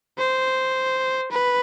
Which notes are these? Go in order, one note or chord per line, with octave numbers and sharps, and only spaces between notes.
C5
B4